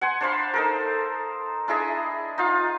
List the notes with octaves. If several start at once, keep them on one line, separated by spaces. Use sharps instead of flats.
F#5 G#5 C6
D4 C5 F5 B5
D#4 A4 A#4
D4 E4 G#4 D#5
D#4 F4 F5